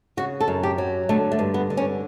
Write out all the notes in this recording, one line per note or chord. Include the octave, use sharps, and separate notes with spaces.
C#3 F#4
A4
F#2
G4
F#3
D3 A3
A3
G2
B3
D3
C#4